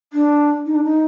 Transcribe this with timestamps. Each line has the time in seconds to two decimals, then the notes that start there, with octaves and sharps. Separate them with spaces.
0.13 D4
0.66 D#4
0.75 D4
0.84 D#4